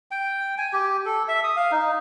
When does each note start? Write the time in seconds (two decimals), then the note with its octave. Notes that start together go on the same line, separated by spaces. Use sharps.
0.11 G5
0.58 G#5
0.73 G4
1.05 A4
1.28 E5
1.44 D#6
1.56 F5
1.72 D#4